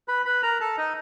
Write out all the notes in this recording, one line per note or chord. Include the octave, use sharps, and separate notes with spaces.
B4 B5
B4 B5
A#4 A#5
A4 A5
D#4 D#5